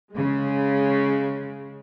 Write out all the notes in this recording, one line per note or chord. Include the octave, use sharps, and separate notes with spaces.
C#3 G#3